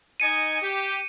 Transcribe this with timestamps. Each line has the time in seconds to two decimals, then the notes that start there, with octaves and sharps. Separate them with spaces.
0.20 D#4 D#5 G#5 C#7 D#7
0.61 G4